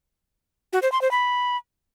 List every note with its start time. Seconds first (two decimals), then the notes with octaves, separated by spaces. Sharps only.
0.73 F#4
0.82 C5
0.92 C6
1.02 C5
1.11 B5